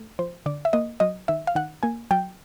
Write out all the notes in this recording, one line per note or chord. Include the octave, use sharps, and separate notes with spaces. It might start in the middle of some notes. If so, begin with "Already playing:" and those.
Already playing: A3
F3 C5
D3 D5
E5
A#3 D#5
F#3 D#5
D#3 E5
F5
D#3 F#5
A#3 G#5
F#3 G5